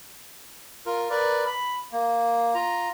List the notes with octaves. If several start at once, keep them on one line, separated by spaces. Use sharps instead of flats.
F4 A#4
A#4 B4 D5
B5
A#3
F4 A#5